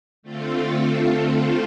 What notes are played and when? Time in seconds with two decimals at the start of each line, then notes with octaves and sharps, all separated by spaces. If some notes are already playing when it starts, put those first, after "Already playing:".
0.23 D3 A3 C4 F4 A4